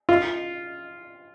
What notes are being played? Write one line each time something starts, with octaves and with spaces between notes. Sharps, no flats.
F4